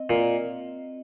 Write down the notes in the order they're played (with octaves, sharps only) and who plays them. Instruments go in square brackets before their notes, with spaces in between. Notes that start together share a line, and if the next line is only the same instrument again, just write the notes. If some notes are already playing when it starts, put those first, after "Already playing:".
Already playing: [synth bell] C4 D#5
[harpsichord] A#2